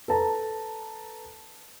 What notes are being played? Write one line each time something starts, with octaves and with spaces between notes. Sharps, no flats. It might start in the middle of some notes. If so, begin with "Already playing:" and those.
A4 B4 A5 A#5